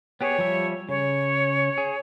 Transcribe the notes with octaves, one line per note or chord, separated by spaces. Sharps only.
B3 G4 G#4 C#5
F3 G3 E5
C#3 C#5
G#4